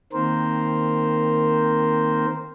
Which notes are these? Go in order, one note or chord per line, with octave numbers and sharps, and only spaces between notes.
D#3 A#3 C4 A#4 C5